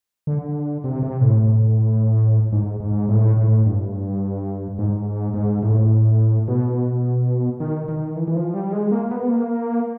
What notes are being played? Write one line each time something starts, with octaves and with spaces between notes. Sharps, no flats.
D3
C3
C3
A2
G#2
G#2
A2
A2
G2
G#2
G#2
A2
B2
D#3
D#3
E3
E3
F3
G3
G#3
A#3
B3
A#3